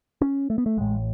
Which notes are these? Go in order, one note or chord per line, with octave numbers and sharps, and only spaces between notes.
C#4
A3
B3
A3
A1 A2 G#3